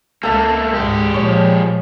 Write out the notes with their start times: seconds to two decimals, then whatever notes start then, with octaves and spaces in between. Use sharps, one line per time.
0.23 C#2 A3 A#3 A4 F5
0.73 C#2 G#2 G#3 G4
1.14 A#2 F3 C#5